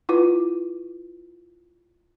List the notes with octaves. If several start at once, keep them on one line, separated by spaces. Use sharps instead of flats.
E4 F4 B4